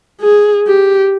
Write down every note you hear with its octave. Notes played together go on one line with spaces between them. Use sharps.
G#4
G4